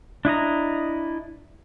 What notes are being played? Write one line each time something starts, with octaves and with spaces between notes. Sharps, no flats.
D4 E4 D#5 A#5